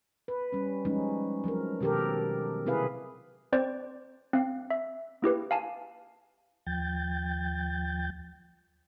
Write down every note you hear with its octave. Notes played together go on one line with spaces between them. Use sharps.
B4
G3 C#4
F3 G3 G#3 C#4 D#4
F3 F#3 C4 A#4
B2 D#3 G4 A4 A#4
C3 C4 E4 G#4 B4 F5
C4 C5 D5
C4 F5
E5
A#3 E4 G4 B4
F5 G#5 A5
D#2 F3 G5 G6 A6